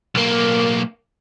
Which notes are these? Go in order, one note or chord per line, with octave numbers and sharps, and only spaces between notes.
B1 A#3